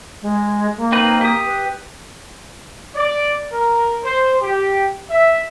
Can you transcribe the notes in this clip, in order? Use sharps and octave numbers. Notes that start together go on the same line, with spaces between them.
G#3
A#3
C4 D#4 B4
G4 D#6
B4
D5
A#4
C5
G4
E5